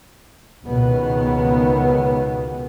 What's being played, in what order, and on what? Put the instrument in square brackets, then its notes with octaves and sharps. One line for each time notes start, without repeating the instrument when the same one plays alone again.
[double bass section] C#2 B2 D#3 B3